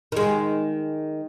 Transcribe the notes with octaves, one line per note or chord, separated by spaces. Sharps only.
D#3 G#3